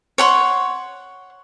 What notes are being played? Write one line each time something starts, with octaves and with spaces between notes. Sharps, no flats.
C#5 F#5 C6